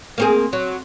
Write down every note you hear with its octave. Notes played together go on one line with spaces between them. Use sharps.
A#3 C4 G#4
F#3